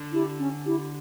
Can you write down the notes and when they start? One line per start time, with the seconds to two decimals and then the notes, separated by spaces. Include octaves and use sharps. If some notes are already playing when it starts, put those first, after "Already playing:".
Already playing: D3
0.12 E4 G4
0.38 C#4
0.64 E4 G4